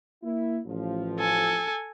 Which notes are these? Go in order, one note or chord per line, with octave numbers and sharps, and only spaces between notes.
A#3 E4
A1 F3
A4 G#5